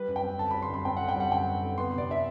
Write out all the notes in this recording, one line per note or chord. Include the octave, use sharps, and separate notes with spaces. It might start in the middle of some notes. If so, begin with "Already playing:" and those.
Already playing: G3 B4
F#2
G5
C4
D3 A5
G3 B5
C6
F#2 B5
C4 G5
D3 F#5
G5
G3 F#5
F#2 G5
C4
D3
B3 C6
C3 D5
D4 E5